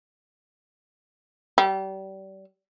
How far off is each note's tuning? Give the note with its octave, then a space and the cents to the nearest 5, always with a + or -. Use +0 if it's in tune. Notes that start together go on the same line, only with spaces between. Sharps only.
G3 -30